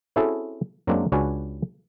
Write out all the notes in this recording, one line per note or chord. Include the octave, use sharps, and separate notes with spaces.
C4 C#4 E4 F#4 G#4 A4
F#2 F#3 G#3 A#3 C4 D4
C#2 C#4 D4 F#4 B4 G#5